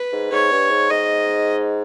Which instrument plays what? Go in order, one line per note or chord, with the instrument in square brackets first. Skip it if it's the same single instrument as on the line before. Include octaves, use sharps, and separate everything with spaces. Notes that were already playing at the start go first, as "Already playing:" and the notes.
Already playing: [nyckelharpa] B4
[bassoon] G#2
[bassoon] G#2 [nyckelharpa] C#5
[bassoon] G2
G#2
[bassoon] G#2 [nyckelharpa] D#5